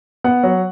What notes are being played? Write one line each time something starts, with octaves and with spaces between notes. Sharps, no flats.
B3 F#5
F#3